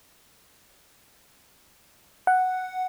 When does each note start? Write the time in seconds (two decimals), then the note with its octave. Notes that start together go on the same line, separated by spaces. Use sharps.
2.27 F#5